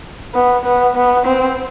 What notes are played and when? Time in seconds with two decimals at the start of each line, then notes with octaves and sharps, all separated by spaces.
0.34 B3
0.65 B3
0.96 B3
1.26 C4